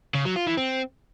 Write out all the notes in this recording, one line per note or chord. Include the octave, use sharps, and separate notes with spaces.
C#3
F#3
F4
E3
C4